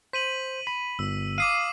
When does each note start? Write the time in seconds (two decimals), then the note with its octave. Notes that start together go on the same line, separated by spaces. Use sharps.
0.13 C5 B6 D#7 F#7
0.67 B5
0.99 G1 E6
1.38 F5 D6 D#6 C7 D#7